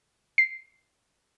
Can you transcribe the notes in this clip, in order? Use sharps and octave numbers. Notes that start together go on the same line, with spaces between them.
C7